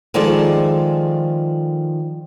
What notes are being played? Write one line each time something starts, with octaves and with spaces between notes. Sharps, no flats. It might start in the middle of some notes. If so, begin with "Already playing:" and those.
D#3 F3 G#3 A4 D5